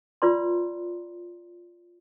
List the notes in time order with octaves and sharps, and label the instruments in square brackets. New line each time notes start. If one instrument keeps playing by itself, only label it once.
[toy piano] F4 B4 D5 A#5 C6